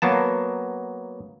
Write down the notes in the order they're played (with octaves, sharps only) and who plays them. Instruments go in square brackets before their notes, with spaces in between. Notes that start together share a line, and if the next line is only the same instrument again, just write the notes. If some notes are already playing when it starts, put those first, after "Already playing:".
[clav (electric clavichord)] F#3 A#3 B3 A5